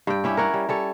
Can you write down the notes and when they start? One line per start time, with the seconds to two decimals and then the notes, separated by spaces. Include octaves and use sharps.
0.07 G2 G5
0.24 C#4 E4 G4
0.37 A#4 C#5 F#5
0.54 G3
0.69 G3 A4 C#5